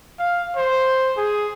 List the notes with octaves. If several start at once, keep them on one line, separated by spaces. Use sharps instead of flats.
F5
C5
G#4